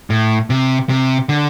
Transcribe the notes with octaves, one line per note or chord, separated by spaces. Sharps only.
A2
C3
C3
D3